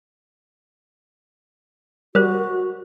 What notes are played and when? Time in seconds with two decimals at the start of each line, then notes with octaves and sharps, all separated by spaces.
2.15 G3 F#4 A#4 C5